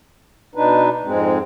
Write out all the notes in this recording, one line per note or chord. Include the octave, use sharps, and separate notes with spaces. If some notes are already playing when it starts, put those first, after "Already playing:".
B2 D4 D#4 B4
F2 G#2 G#3 C4